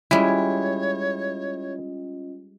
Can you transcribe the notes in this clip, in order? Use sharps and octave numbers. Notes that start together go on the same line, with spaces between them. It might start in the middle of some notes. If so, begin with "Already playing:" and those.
G3 G#3 C#4 E4 F4 C#5 D#5